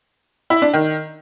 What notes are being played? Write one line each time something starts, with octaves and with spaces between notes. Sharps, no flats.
E4
D4
D#3